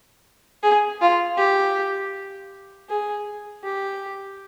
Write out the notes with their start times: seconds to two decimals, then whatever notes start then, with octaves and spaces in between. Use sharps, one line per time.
0.63 G#4
1.01 F4
1.37 G4
2.88 G#4
3.63 G4